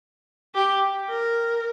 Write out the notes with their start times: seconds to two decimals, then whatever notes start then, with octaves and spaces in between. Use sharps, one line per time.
0.55 G4
1.10 A#4